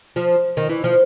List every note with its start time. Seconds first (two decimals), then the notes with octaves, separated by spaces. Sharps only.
0.16 F3
0.57 D#3
0.69 E3
0.84 F3